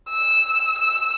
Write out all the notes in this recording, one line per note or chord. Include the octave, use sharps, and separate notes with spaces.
E6
E6